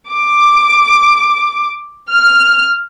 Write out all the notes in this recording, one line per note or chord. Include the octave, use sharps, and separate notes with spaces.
D6
F6